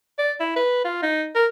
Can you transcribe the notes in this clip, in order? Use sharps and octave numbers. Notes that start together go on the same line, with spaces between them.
D5
E4
B4
F4
D#4
A#4